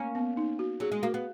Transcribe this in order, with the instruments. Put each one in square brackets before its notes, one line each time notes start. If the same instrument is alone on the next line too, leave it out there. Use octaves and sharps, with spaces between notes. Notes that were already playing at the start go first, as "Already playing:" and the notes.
Already playing: [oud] A#3 C#4
[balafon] B3
D#4
F#4
[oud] F#3 [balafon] G#4
[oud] G#3
[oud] A#3 [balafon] F#4
[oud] B3